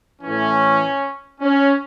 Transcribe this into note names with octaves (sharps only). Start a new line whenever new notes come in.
A2 E3 C#4
C#4